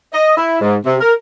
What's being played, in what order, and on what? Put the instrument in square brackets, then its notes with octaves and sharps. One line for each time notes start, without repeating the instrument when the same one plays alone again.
[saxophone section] D#5
E4
G#2
C3
A#4